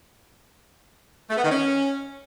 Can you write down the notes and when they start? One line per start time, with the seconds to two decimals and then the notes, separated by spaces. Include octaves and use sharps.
1.30 A3
1.37 B3
1.44 D#3
1.51 C#4